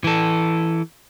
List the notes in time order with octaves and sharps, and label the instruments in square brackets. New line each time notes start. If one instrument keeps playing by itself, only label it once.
[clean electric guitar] E3 A4